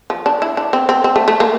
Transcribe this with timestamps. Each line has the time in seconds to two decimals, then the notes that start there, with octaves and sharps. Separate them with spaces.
0.10 F3
0.26 D4
0.42 E4
0.57 D4
0.73 C4
0.89 C4
1.04 C4
1.16 A3
1.28 A3
1.40 A#3